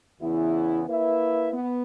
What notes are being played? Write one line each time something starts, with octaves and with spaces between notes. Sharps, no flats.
E2 C#3 E3 B3 E4
A#3 E4 B4 E5
B3